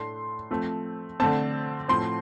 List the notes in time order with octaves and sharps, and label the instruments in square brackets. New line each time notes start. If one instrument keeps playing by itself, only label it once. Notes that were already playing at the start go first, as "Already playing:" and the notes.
Already playing: [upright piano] A2 A3 D4 C6
F3 A3 C4
D3 A3 C4 A5
A2 F3 C4 C6